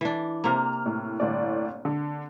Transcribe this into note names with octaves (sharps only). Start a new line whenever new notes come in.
E3 D4
C3 A#3 C4 F6
A2
G1 A2 D5
D3